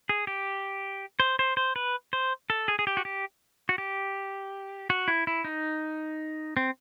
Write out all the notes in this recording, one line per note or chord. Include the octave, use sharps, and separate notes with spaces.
G#4
G4
C5
C5
C5
B4
C5
A4
G#4
G#4
G4
F#4
G4
F#4
G4
F#4
E4
E4
D#4
C4